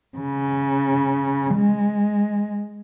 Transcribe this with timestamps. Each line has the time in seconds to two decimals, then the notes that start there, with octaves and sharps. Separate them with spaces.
0.18 C#3
1.55 G#3